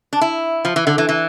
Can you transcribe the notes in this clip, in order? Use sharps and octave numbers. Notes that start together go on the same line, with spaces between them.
D4
E4
F3
E3
D3
E3
E3